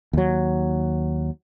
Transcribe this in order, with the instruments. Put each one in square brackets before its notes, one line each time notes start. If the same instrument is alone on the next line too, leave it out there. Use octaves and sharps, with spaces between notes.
[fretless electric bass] D#2 F#3